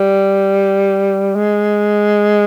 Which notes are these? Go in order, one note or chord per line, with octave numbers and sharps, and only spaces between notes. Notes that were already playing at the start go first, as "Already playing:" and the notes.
Already playing: G3
G#3